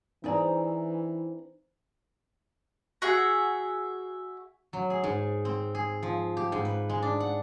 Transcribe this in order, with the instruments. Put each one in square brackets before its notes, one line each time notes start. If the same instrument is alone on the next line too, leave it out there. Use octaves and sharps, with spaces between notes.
[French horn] E3 [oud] C4 D4 G#4 [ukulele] D#4 D5 A#5
[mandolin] F#4 G#4 E5 F#5
[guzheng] F#3
G#4
G#2
C4
G#4
F3
G4
G#2
B4
G#3
D4
F#5